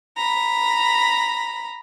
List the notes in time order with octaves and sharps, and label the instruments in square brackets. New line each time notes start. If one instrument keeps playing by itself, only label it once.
[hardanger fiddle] A#5 B5